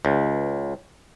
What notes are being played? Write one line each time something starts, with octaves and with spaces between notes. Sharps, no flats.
C#2